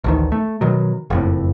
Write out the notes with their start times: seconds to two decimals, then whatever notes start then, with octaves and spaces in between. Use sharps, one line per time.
0.04 A1 D2 D#3
0.32 A3
0.61 B2 D#3 F#3
1.10 F#1 F2 A2